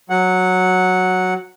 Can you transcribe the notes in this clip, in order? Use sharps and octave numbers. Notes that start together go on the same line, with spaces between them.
F#3 F#5